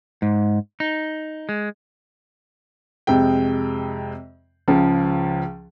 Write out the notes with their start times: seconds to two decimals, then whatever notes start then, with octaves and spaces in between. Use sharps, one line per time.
0.22 G#2
0.80 D#4
1.49 G#3
3.07 F2 C3 G#3 G5
4.68 C#2 C#3 F3